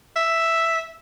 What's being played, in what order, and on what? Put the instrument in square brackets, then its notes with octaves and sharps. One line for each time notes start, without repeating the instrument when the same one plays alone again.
[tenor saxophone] E5